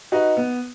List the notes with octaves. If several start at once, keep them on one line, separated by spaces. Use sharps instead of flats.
D#4 F#4 B4 D#5
B3